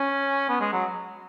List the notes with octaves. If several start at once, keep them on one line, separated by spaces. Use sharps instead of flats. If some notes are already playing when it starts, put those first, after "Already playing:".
Already playing: C#4
B3
G#3
F#3